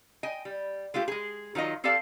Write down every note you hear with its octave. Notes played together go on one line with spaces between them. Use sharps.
D#5 G5 G#5
G3
G#3 A3 F4 G4
G#3 G#4
D#3 F#3 F4 D#5
C4 G4 A4 D5 F5 A5